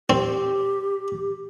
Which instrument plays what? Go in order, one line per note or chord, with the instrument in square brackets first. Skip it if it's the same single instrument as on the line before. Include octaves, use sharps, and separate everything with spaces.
[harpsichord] C4 [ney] G4